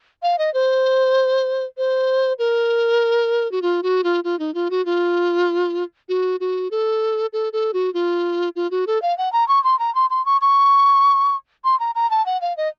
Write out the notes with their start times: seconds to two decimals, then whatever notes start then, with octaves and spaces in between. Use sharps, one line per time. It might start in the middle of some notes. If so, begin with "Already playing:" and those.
0.23 F5
0.39 D#5
0.54 C5
1.77 C5
2.39 A#4
3.52 F#4
3.62 F4
3.83 F#4
4.04 F4
4.24 F4
4.39 D#4
4.54 F4
4.71 F#4
4.85 F4
6.09 F#4
6.40 F#4
6.71 A4
7.33 A4
7.53 A4
7.74 F#4
7.94 F4
8.56 F4
8.71 F#4
8.87 A4
9.02 F5
9.18 F#5
9.33 A#5
9.48 C#6
9.64 C6
9.79 A#5
9.95 C6
10.10 C6
10.26 C#6
10.41 C#6
11.64 C6
11.80 A#5
11.95 A#5
12.10 A5
12.26 F#5
12.42 F5
12.57 D#5